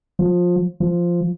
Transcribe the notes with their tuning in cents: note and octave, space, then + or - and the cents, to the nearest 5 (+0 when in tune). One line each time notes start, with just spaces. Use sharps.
F3 +20
F3 -5